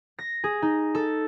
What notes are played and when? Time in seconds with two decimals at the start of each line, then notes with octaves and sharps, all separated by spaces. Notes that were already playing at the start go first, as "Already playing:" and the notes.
0.19 A#6
0.44 G#4
0.62 D#4
0.95 A4